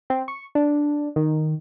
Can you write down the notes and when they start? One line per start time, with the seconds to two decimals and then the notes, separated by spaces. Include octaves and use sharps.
0.10 C4
0.28 C#6
0.55 D4
1.16 D#3